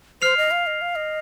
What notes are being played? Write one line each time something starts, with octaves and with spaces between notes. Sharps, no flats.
C5 F6 C7 F7
D#5
F5
D#5
F5
D#5